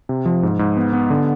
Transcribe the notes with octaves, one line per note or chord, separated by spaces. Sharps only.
C3
F3
G#2
G#2
B3
B3
D3